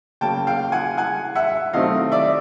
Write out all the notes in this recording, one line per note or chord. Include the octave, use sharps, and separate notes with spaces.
C#3 F#3 A#3 G5 A5
F5 G5
F#5 G#5
F#5 G#5
E5 F#5
C3 D#3 F#3 A3 C4 D#5 F5
D5 E5